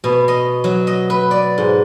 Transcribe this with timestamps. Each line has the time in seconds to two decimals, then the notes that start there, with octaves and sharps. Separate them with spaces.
0.04 B2
0.28 D#5
0.64 F#3
0.87 D#5
1.10 B4
1.31 D5
1.58 G#2